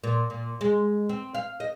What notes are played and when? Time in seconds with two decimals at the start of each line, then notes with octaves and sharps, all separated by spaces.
0.04 A#2
0.30 A#2
0.61 G#3
1.09 C4
1.35 F5
1.60 D#5